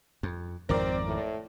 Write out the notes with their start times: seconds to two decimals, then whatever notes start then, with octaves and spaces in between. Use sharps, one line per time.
0.23 F2
0.69 G#1 F2 D#3 C4 A#4 D5
1.05 A2